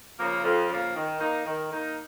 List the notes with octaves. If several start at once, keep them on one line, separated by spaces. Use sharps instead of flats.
C#3 F3 A#3
F2
C#3 F3 A#3
D#3
A#3 D#4
D#3
A#3 D#4